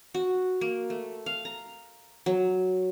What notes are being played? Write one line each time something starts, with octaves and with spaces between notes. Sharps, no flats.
F#4
A#3
A3
F5
A#5
F#3